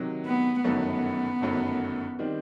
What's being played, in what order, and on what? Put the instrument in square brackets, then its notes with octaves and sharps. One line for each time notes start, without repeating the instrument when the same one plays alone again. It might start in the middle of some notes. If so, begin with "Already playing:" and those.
Already playing: [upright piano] C3 D#3 F#3
[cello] B3
[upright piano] G1 F#2 D#3 F#3 A3 [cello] B3
[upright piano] G1 F#2 D#3 F#3 A3
D#3 G3 C4